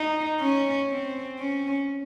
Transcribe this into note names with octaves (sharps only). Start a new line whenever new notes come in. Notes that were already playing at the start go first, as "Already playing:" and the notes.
Already playing: D#4
C#4
C4
C#4